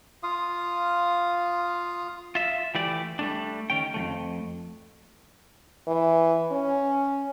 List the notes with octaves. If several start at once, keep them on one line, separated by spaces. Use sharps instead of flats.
F4 F5 D#6
F4 E5
E3 A3 G4 D5
G3 A3 D4
D#3 C#4 G5
F2 F3 A3
E3
C#4